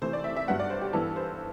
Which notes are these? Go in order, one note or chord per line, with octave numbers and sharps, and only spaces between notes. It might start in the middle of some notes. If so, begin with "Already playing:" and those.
C3 E3 A3 E4 C5
D5
E5
E5
G2 F#3 B3 F#5
D5
C5
G4
G2 E3 B3 E4 A4
C5